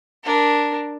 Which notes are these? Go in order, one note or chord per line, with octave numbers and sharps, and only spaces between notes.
D4 A#4